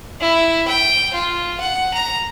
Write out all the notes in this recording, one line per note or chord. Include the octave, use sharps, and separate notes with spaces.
E4
G5
F4
F#5
A#5